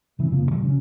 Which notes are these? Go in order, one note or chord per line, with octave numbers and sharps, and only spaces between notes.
C3 E3 G3 C4
F#2 C#3 F3 A#3
D2 A#2 E3 G3
C#3 F#3 C4 C#4